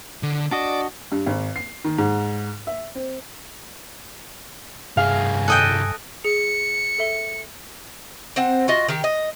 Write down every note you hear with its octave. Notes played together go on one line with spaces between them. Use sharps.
D3
D4 F#4 D5 D#5
G2
G#1
C7
D#3
G#2
E5
C4
C2 G2 G#4 F5 G#5
A4 D#5 G5 F#6
G#4 C#7
A4 E5 G7
C4 C5 F#5
F4 F#4 D#5
D#3 G4
D#5